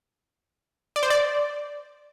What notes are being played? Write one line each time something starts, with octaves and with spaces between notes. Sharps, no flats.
D5
C5
D5